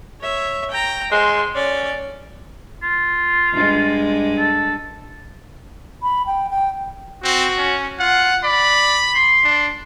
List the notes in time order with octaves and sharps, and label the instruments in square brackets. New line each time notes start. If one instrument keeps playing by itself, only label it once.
[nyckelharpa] C#5 E5
G5 A#5
[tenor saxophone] G#3 [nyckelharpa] C5
[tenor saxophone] C#4 [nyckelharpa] D5
[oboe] F4
[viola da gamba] G2 G#3
[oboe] A4
[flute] B5
G5
G5
[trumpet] C4 [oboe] F#4
[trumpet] C#4
[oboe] F4 [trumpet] F#5
[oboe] D5 [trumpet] B5
[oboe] C6
[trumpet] D4